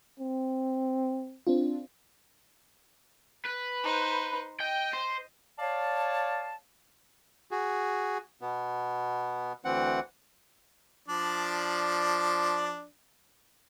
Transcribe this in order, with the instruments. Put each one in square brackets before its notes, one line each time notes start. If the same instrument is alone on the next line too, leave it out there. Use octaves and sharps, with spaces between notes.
[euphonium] C4
[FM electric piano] C4 D4 F4
[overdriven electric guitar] B4
[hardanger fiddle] D#4 C5
[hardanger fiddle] D#5 [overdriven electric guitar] G5
[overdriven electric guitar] C5
[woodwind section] C#5 D5 F5 A5
[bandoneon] F#4 G#4
B2 B3
D2 E3 C4 F#5
[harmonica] F3 D4 D5